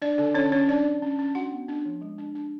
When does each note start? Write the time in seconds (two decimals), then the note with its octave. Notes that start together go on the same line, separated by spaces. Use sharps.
0.02 D4 D5
0.18 D3 D4 D5
0.35 D3 C#4 C#5
0.52 D3 C#4 C#5
0.68 F#3 D4 D5
0.85 C#4
1.02 C#4
1.19 C#4
1.35 D4 F#4 F#5
1.52 B3
1.68 D4
1.85 F3
2.01 G#3
2.18 D4
2.35 D4